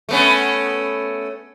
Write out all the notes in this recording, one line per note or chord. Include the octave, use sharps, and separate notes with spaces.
A3 B3 C#4